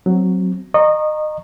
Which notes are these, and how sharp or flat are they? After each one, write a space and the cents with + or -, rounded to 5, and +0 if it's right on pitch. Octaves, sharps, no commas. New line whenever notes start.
F#3 +0 C4 +0
D#5 -25 A#5 +0 C#6 -20